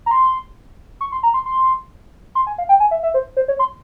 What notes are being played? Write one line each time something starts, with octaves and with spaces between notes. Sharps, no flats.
A#5
C6
C#6
C6
A#5
C6
C6
C6
G#5
F5
G5
G#5
E5
E5
C5
C5
C#5
C6